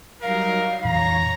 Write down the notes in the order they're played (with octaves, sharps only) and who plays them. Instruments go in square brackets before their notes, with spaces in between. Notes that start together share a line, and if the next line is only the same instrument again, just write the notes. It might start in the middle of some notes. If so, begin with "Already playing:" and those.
[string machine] F#3 G3 D#4 [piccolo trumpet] A#4 [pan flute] F5
[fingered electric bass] F2 A#2 E3 [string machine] C#5 A#6 [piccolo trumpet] A#5